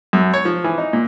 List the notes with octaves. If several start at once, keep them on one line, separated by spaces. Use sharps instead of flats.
F#2
C#5
F3
E3
D#4
A#2